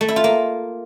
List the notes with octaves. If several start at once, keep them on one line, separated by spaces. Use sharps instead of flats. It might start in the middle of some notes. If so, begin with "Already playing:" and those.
A3
E4
F4
A#3